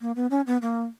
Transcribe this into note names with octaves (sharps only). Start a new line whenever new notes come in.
A#3
B3
C#4
B3
A#3